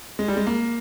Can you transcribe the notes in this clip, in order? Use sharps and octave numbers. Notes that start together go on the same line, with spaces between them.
G#3
G3
G#3
A#3